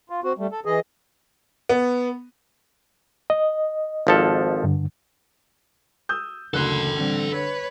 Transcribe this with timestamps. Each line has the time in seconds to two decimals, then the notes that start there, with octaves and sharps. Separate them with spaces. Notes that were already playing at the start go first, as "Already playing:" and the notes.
0.10 F4
0.24 C4 F#4
0.38 G3 A3
0.52 A4
0.65 E3 G#4 D#5
1.69 B3
3.30 D#5
4.07 G#1 F3 A4
4.64 G2 D3
6.09 D#6 E6 G6
6.54 F#1 D2 A4 C6 F#6
6.97 D3 G3 C4
7.30 B4 C#5